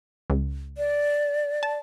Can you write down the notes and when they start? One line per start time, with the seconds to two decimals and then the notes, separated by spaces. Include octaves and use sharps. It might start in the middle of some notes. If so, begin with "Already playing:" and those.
0.30 C#2
0.78 D5
1.63 A5